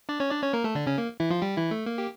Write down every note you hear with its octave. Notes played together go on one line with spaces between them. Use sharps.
D4 D5
C#4 C#5
D4 D5
C#4 C#5
A#3 A#4
A3 A4
D3 D4
C#3 C#4
A#3
E3 E4
F3 F4
G3 G4
E3 E4
A3
A#3
G4